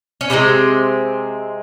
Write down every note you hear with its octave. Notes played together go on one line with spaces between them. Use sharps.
C#4
C3 F3 G#3 C4